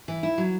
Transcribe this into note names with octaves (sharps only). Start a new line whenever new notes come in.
E3
E4
F#3